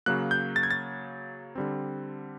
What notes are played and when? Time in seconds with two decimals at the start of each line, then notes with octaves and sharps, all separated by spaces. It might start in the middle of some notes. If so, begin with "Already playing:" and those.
0.06 C#3 F#3 A#3 F#6
0.31 G6
0.56 A6
0.63 G#6
0.71 A6
1.55 D3 G3 C4